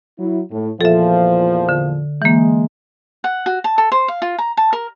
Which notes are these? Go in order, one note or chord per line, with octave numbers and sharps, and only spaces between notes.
F#3 E4
A2
E2 A#2 F3 A4 E5
D3
E3 G#3 A#3
F#5
F#4
A5
A4
C5
F5
F4
A#5
A5
A#4